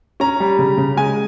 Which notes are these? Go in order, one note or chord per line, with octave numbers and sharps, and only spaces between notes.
C#4 A#5
G3
C#3
C#3
G#3 G#5